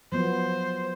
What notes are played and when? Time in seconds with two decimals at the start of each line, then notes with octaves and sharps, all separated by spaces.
0.12 F3 F#3 B3 C5